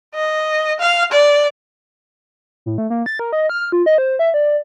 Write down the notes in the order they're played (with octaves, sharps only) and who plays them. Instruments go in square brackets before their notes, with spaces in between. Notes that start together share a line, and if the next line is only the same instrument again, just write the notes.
[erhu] D#5
F5
D5
[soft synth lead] A2
A3
A#3
A6
A#4
D#5
F6
F4
D#5
C5
E5
D5